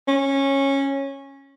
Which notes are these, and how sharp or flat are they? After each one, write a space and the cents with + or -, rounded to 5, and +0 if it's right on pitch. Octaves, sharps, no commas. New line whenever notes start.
C#4 -15